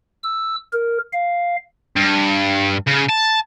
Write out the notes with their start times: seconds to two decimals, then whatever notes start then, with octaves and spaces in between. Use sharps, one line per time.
0.23 E6
0.73 A#4
1.13 F5
1.96 G2
2.87 C#3
3.09 A5